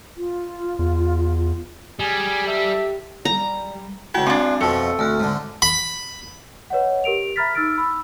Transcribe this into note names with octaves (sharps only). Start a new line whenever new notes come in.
F4
E2
G3 G#4 G#5
G4 A4 E5
G3 A#5
C#2 E4 F#4 F#5 G5
G#3 C4 D4 F4
F2 B2 F3 A3
D2 A5 F6 F#6
G#2 D3
B5
B4 C#5 D#5 F#5
G4 A#4 D7 F7
E5 A#5 B5 F6 A6 B6
D#4 E6 F6 A6 D7
B5 E6